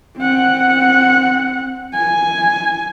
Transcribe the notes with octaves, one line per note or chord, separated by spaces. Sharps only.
C4 F#5
G#5